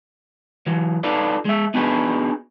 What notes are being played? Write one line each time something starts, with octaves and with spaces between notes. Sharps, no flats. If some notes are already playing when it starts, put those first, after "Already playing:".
E3 F#3
D#4 F4 A4 B4 D5
G#3 E5
B3 D4 D#4 F#4 G#4 B4